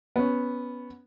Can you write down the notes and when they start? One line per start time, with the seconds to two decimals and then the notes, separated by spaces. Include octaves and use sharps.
0.16 B3 C#4